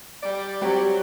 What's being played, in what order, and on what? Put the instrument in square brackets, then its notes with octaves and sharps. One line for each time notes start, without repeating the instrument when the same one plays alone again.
[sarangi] G3 [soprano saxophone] D5
[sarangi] F#3 [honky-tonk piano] G3 C4 G4